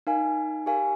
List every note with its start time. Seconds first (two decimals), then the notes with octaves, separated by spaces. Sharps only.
0.07 D#4 A#4 F5 G#5
0.66 G4 A#4 F5 G#5